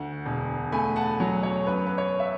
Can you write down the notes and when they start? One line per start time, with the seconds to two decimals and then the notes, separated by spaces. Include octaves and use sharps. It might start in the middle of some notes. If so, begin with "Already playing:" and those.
Already playing: D2 F#5
0.26 E1
0.72 A3 G#5 B5
0.96 F#5 A5
1.20 F#3
1.43 C#5
1.67 F#2 B4
1.86 B4
1.98 C#5
2.20 E5